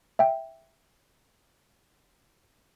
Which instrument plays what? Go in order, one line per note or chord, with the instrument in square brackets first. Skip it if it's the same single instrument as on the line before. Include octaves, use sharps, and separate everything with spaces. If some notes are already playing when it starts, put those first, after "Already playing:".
[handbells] E5 G5